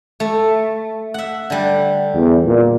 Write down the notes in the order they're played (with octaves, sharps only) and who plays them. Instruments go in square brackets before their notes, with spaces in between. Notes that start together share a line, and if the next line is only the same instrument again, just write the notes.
[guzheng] A3
E5 F#5
D3 G3
[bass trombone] E2
A#2